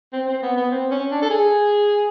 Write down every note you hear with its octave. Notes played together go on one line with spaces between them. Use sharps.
C4
C4
B3
B3
C4
C#4
D4
A4
G#4